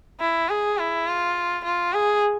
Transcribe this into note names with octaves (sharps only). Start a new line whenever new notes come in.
E4
G#4
E4
F4
F4
G#4